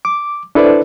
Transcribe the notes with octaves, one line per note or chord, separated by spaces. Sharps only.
D6
D4 E4 A4 B4 C5 D5